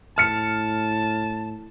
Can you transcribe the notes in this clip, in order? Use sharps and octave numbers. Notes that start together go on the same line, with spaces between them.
A2 A5 F6 C#7